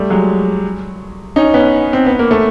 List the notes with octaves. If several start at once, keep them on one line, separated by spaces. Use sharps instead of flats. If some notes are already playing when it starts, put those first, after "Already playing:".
Already playing: G3 A3
F#3 G#3
C#4 D#4
B3 C#4
C4
B3
A#3
A3